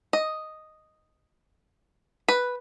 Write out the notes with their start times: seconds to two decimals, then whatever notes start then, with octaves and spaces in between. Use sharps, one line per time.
0.13 D#5
2.28 B4